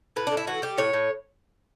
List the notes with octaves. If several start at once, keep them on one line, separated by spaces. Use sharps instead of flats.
A2 B4
A2 D4
E4
E3 F#4
G3 G4
A2 C#5
A2